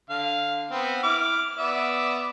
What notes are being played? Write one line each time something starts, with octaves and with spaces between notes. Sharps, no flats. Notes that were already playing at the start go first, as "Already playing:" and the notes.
D3 F5
B3 C4
E4 D6 F6
B3 D5 E5